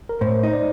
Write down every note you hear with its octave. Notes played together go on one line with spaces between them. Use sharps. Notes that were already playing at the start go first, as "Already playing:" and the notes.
A#4
A2 C5
D#4 C5
D5